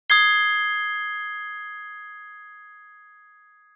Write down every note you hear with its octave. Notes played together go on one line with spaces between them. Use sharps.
D#6 G#6 C7 G7